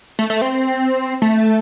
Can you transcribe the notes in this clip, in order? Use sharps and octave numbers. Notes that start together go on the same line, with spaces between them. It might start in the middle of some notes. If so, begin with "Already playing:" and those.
A3
A3
C4
A3